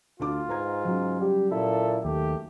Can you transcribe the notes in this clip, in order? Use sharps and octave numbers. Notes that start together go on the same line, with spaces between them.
D2 D4 F4 D6
G#2 B4 A#5 G#6
C#3 F#3
G3 G4
A#2 E4 A4
D#2 A3 G4